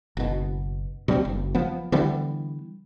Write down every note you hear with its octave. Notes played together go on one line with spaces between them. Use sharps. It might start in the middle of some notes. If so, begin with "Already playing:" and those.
F#1 B2
B2 G3 A#3 C4
F#1
F3 B3
D3 E3 G3 B3